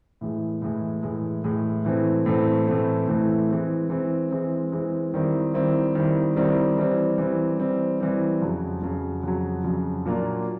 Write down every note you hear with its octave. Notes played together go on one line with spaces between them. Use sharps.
A2 E3 G#3
A2 E3 G#3
A2 E3 G#3
A2 E3 G#3
A2 E3 A3 C4
A2 E3 A3 C4
A2 E3 A3 C4
A2 E3 A3 C4
E3 G#3 C4
E3 G#3 C4
E3 G#3 C4
E3 G#3 C4
D#3 G3 C4 E4
D#3 G3 C4 E4
D#3 G3 C4 E4
D#3 G3 C4 E4
E3 G3 C4
E3 G3 C4
E3 G3 C4
E3 G3 C4
F2 C#3 F#3
F2 C#3 F#3
F2 C#3 F#3
F2 C#3 F#3
A#2 F#3 A#3 D4 F4